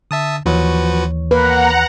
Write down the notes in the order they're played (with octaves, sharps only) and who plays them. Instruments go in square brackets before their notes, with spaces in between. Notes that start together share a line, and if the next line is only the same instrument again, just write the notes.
[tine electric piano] D3 [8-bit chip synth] E5 A5 D#6
[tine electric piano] D#2 E3 C#5 [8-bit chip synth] F3 F#4 B4
[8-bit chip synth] A#3 [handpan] B4 [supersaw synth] F#5 A#5